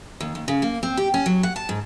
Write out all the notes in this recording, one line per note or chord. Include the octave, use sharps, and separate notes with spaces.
D#2
D#2
C#3
A#3
C4
G4
C#4
F#3
F#5
A5
G#2